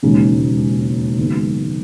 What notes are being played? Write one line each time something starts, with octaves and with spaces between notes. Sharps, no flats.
E1 D#2 C#3 G#3 D#4
F#1 F#2 D#3 G#3 B3